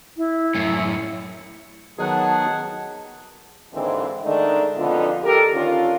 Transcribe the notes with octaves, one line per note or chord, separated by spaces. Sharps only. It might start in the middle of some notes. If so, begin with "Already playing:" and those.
E4
F#2 A2
D#3 F#3 B3 D#4 G#4 F#5 A5
D#2 G#2 D3 E3 C4 D#4
D3 D#3 G#3 A3 D4 D#4
F2 B2 D3 B3 D#4 F4
G4 A4 A#4
D3 D#3 C#4 D4 F4